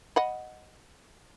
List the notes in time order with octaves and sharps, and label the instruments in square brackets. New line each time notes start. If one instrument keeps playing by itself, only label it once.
[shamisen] D#5 F#5 B5